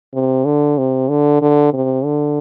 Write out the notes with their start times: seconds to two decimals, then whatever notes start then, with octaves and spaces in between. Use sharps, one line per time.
0.14 C3
0.45 D3
0.78 C3
1.09 D3
1.42 D3
1.73 C3
2.05 D3